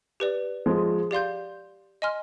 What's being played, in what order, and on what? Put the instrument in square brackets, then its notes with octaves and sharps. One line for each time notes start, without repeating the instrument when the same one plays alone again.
[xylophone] G4 B4 D5
[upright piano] F3 G#3
[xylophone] G4 D5 F5 C6 G6
D#5 G#5 C6 F6